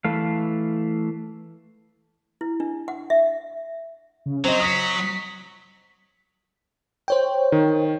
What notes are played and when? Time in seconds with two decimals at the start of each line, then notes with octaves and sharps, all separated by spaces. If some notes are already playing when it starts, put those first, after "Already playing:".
0.05 E3 A3 F5
2.41 E4
2.60 D4
2.88 F#5
3.10 E5
4.26 C#3
4.44 F#3 C4 C5 D#5
4.60 D#6 B6 C#7
7.08 C5 C#5 G5
7.52 D#3